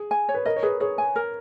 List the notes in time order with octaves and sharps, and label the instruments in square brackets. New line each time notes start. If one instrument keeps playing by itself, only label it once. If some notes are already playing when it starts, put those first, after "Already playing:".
Already playing: [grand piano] G#4
[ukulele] G#5
C#5
[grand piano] B4
[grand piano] A#4 [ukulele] D#5
[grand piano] C#5
[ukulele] G#4 [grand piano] B4
[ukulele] G#4 [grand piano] C#5
[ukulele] G#5
A#4